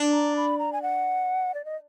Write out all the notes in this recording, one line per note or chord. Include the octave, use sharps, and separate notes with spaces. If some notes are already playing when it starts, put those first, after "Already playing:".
Already playing: D4
A#5
B5
A#5
G#5
F#5
D5
D#5